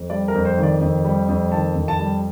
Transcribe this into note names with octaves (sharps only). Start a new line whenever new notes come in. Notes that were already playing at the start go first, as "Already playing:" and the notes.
Already playing: F2
G3 D5
A#4
F2
C5
D#3
D5
F2
G3
F2
D#3 A5
F2
A5
G3